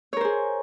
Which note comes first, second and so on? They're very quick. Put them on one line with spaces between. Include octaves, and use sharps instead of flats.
C#5 A#4 C5 G#4